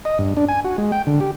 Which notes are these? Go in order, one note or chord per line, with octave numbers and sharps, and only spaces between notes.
D#5
G2
D4
G#5
F#4
G#3
G5
D3
G4